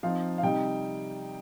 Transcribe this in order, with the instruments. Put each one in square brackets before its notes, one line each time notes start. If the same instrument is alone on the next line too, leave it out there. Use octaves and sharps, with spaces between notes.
[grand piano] F3 C4 D#4 F5
F5
C3 G3 D#4 G5